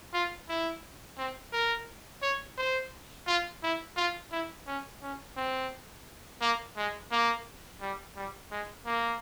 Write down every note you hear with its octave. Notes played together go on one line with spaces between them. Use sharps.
F4
E4
C4
A#4
C#5
C5
F4
E4
F4
E4
C#4
C#4
C4
A#3
G#3
A#3
G3
G3
G#3
A#3